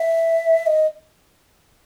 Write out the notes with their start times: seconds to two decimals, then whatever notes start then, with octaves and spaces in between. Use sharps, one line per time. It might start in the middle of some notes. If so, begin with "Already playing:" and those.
Already playing: E5
0.67 D#5